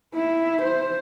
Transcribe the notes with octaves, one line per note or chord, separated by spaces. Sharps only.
E4
C5